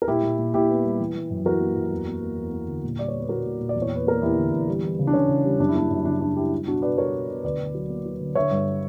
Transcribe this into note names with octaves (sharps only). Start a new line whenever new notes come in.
A#4
A#2 E4 G4
A#2
A#2
A#2 E4 G4
B3
G3
E3
E3
F#2
E3 F#4 A#4
A#3
F#2
E2
A#3
A#3
E2
A#3
D3
A#2
G3 D5
C#5
B3
B4
A#2 F#4 A#4
A#2
A#2
D5
E2
C#5
E2 B4
A#3 A#4
E2 E4 G4
D3
E2
G3
E3
C#3
D4
C#3 C#4
C#3
G3
F#2 D4
E4
A#3 D4
F#2
C#3 D4
F#2 D4
G3 E4 G4
G3
B2 D4 F#4
B2 B4 D5
G3 A#4 C#5
B2
B2
D2 B4 D5
D2
F#3
A#3
F#3
D3
D3 C#5 E5
G2